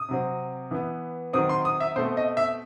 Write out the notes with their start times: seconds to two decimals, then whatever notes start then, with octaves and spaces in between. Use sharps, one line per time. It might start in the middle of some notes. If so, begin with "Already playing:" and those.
Already playing: D#6
0.09 C3 F#3 C4
0.71 E3 B3
1.33 D#3 F#3 C4 D#6
1.49 C6
1.65 D#6
1.80 E5
1.96 B2 A3 C4 C5
2.17 D#5
2.37 E5